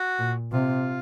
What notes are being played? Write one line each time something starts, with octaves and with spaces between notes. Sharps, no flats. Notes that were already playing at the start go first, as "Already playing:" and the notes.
Already playing: F#4
A#2
C3 F4